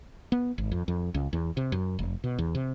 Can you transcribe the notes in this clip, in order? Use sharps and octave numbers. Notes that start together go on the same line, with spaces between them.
B3
G#1
F2
F2
C#2
E2
C3
F#2
F1
B2
E2
C3